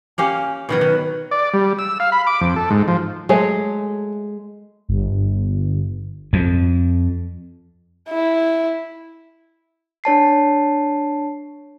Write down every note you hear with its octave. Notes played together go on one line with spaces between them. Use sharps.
A#3 C#4 G4 G#5
B2 D#3 F#3 B4
D#3
D5
G3
E6
F5
B5
D6
F2
A4
G#2
F3
F#3 G#3 A3 C#5
G1
F2
E4
D4 C#5 A5 C7